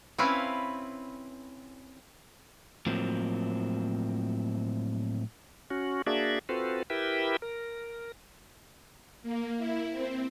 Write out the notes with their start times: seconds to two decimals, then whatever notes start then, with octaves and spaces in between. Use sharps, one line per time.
0.18 C4 C#4 E4 B4 F5
2.86 A2 F3 F#3 A#3 C4
5.70 C#4 F#4
6.07 A#3 D4 F#4 G#4 D5 E5
6.49 C4 F4 F#4 A4 B4 C5
6.90 E4 G4 A#4 B4 E5 G5
7.42 A#4
9.23 A#3
9.58 E4
9.91 C4